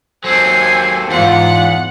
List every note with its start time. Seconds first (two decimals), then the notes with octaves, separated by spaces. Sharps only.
0.24 D#2 F#3 C4 A4 C5 G#5 C7
1.11 E2 G#2 F4 F#5